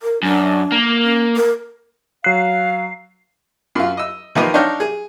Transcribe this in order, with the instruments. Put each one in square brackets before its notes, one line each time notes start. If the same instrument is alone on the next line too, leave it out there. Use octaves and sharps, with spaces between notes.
[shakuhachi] A#4
[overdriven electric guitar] F#2 [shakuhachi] D4
[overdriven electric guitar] A#3
[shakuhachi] C#4
A#4
[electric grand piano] F#3 F#6 [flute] F5 [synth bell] C7
[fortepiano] F#2 F4
D#5 E6
D#3 F3 A#3 B4 D#5
D4 D#4 C#5 F5 G5 A#5
G#4